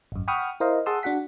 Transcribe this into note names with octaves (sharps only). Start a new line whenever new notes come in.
G#1 F#2
F#5 G5 B5 C#6 D#6 F6
E4 A#4 C5 D#5 F5
G#4 F#5 A5 C6 D#6 E6
D4 F#4 F#5 B6